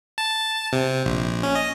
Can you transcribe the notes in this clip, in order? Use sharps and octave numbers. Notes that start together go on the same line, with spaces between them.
A5
C3
A#1
C#4
D#5